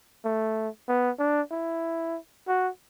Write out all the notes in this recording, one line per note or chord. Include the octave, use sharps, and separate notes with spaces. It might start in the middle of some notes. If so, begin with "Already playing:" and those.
A3
B3
D4
E4
F#4